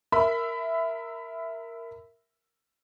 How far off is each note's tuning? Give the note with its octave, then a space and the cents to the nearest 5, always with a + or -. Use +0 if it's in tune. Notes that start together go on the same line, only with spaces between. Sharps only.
A#4 -5 E5 +0 B5 +30